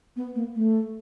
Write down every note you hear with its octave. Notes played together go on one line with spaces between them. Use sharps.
B3
A#3
A3